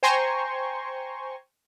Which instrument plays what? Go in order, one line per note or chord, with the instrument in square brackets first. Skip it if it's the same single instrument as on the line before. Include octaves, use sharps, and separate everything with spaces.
[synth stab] C5 G5 G#5 A#5 C6 C#6